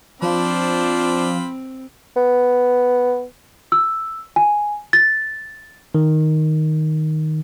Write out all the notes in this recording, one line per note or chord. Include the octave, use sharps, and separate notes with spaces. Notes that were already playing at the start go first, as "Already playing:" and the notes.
F3 C4 D4 F4 C5 B5
B3
E6
G#5
A6
D#3